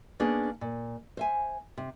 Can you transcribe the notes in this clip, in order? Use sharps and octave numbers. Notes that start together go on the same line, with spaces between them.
A#3 B3 C#4 D4 G#4
A#2
C5 E5 G#5
C3